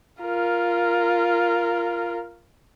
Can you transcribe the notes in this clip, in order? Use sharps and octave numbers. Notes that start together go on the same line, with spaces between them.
F4 A#4